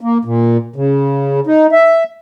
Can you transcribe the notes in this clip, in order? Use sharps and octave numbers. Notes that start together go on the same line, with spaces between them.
A#3
A#2
C#3
D#4
E5